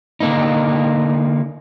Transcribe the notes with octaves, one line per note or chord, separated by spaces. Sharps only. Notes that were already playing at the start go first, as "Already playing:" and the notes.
D3 A#3 D#4